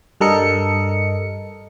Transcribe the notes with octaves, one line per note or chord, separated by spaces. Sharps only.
G2 G3 A4 A#4 D#5 C#7